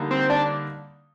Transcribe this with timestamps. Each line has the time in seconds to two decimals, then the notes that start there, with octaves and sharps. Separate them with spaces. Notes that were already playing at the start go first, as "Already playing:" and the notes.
Already playing: D3 G3 A#3 D#4
0.11 C4
0.30 D4